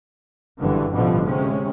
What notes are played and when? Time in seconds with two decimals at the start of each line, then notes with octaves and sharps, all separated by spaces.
0.61 F#1 G2 D3 E3
0.94 A1 B2 D3 F3 G3
1.26 C3 G#3 C#4